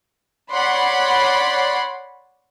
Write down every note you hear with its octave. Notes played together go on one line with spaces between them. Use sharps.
C#5 D5 F#5 B5 C6